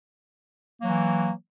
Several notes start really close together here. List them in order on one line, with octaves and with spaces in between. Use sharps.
A#3 F#3 E3